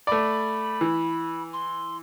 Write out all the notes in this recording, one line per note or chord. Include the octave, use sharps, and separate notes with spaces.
A3 D5 B5
E3
C6